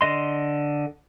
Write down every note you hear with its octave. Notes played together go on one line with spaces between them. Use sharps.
D3 D#5 C6